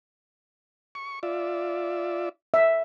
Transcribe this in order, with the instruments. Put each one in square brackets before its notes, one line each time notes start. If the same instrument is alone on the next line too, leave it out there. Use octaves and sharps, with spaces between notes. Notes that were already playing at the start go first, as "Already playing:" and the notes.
[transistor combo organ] C#6
F4 D5 E5
[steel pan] E5